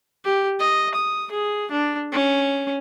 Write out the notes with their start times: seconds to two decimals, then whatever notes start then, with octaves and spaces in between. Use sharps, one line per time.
0.25 G4
0.59 D#5
0.95 D#6
1.31 G#4
1.71 D4
2.12 C#4